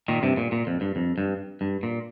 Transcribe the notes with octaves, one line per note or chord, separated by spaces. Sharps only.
A#2 D#3
G2 C3
A#2
A#2
F2
G2
F2
G2
G2
A#2